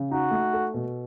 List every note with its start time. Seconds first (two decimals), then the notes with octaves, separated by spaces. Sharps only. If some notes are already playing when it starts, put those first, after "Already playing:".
Already playing: C#3
0.11 D#4 F#4
0.31 A3
0.53 A4
0.74 B2